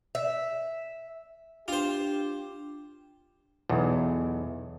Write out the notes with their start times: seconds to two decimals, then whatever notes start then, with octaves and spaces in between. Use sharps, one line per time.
0.15 E5
1.68 D4 F4 G4 C5
3.69 B1 E2